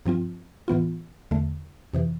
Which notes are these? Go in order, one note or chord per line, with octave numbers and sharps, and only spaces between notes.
G2 F3 C4 F4
A2 E3 B3 F4
E2 D3 A3
F2 C3 E3